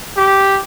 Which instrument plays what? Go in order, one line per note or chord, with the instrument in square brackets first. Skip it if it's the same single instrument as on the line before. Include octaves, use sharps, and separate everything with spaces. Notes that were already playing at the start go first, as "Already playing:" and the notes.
[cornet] G4